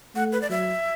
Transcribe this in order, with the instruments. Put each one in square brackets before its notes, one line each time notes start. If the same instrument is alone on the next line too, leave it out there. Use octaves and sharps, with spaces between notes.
[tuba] A3 [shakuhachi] F#5
[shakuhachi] B4
D5
[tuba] F#3 [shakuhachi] E5